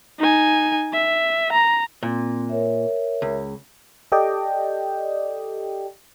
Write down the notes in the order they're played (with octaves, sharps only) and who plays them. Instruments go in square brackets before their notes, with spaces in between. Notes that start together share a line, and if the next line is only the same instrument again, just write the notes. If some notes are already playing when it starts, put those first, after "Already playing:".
[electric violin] D#4 G#5
E5
A#5
[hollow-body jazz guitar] A#2 [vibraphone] C4
[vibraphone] A#4 C#5 E5
[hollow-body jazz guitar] C#2
[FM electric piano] G4 A4 D5 D#5 G5